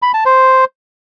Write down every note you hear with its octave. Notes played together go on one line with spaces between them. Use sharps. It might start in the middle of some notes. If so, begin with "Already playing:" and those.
B5
A5
C5